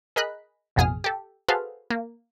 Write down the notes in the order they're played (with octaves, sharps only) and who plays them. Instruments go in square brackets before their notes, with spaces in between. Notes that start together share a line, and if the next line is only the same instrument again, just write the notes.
[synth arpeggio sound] G#4 A#4 D#5 B5 F#6
A1 F2 B2 G#4 D#6 F6
G4 A4
F#4 G#4 A4 B4 C5 F5
A#3